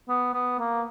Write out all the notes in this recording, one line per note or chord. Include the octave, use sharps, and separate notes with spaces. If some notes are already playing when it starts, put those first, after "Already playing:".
B3
B3
A#3